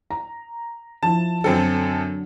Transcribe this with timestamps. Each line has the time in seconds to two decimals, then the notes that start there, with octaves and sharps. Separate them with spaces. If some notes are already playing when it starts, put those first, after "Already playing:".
0.11 A#5
1.03 F3 E4 A5
1.44 F#2 D3 F#3 C4 A4